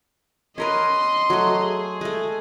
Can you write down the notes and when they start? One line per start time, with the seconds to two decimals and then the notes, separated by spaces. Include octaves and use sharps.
0.58 C#4 A#4 B4 D#5 C6
1.30 F#3 A3
1.65 G#4
2.01 G#3 A3